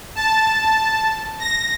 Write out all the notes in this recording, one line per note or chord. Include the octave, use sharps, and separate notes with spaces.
A5
A#6